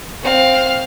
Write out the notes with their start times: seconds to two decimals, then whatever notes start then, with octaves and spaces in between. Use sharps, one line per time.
0.23 C4 F5